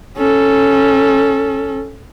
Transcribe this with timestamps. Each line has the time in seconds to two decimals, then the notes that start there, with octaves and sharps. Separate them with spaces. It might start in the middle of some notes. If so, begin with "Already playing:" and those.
0.17 C#4 A4